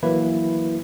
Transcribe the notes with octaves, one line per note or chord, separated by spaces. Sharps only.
E3 F#3 A#3 E4 B4